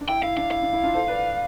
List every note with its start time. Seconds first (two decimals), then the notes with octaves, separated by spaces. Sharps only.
0.01 D4
0.09 E4 G5
0.23 E4 F5
0.37 D4 F5
0.51 E4 F5
0.63 D4
0.73 E4
0.83 D4 F4
0.94 A4 C5
1.08 B4 D5